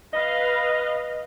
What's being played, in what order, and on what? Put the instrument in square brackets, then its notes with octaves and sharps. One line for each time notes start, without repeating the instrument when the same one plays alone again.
[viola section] B4 F5 [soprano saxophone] D#5